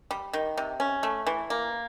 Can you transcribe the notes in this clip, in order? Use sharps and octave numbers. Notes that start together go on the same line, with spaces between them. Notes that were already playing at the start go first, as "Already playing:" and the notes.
G3
D#3
C3
C#4
A3
E3
A#3